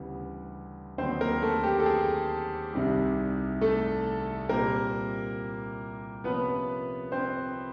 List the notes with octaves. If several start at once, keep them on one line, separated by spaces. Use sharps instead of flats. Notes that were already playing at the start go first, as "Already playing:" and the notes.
Already playing: D2 C#3 E3 G3 B3
D#2 D3 F#3 B3 C4 C5
A#3 A#4
A3 A4
G4
A4
G#4
C2 C3 D#3 G3
A3 A4
A#2 G3 A#3 C4 A#4
C3 F3 A#3 B3 C#4 B4
C4 C5